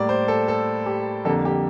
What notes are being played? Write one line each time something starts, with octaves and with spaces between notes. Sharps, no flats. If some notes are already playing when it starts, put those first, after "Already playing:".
Already playing: A2 G3 A#3 D5
C5
A4
A4
G4
F2 D3 G3 A#3 A4
G4